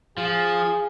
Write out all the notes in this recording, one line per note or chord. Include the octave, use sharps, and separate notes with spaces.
F3 G#4